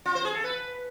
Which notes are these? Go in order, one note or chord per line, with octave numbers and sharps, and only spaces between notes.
F4
C5
G#4
A4
B4